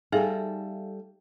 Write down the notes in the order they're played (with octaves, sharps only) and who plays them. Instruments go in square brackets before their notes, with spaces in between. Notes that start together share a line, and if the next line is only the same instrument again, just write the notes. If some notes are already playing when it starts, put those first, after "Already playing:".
[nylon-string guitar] G3 A4 [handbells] D#4 E5 F5 [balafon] G#4 G#5